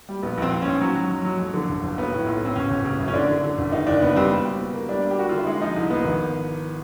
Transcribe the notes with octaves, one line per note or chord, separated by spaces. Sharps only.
G3
A#1 B3
A#1 C4
A#1
G#2 C#4
F#3
F#3
F#3
F#3
F2
D3
G1
G1
B1 B3
A2
B1 F4
A2 C4
G1 C#4
G1
C#3
F#2
C#4
D3 D4
D3
D3
G1
D#3 D#4
F#1 D4
F#1 B3
G3 C4
B2
G3
B2
A#3
G3 D4
G3
G4
A#3 F#4
D3 F4
E4
G#3 D#4
F3 D#4
C2
F3 B3
G#1